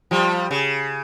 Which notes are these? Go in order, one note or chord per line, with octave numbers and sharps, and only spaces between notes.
F3 G3
C#3